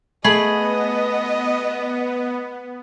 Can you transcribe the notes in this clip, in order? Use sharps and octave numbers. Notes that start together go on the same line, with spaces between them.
A3 B3 G#4 D#5 B5